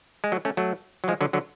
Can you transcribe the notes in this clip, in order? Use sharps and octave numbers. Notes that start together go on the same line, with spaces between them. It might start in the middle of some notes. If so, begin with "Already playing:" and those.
G#3
F#3 A3
A3 C#4
F#3 A3
F#3
F3 G#3
D3 F#3
D3 F#3